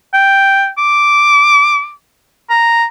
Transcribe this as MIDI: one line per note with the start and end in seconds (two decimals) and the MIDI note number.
0.14 0.69 79
0.78 1.91 86
2.50 2.85 82